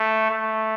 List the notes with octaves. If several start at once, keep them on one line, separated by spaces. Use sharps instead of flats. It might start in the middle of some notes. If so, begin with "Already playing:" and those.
Already playing: A3
A3